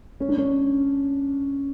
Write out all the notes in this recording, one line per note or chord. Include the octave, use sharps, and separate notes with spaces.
C#4
D4
C#4